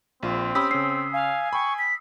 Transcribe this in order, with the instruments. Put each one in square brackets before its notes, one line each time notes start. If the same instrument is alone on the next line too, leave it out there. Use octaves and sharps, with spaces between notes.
[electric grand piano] A#1 F4 [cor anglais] C4
[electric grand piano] C#4 G4 B5 [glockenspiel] D#6 E6 B6
[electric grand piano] C#3 C#4 [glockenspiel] C7
[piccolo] F5 [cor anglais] G#5
[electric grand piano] G5 B5 [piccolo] C#6
[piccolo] B6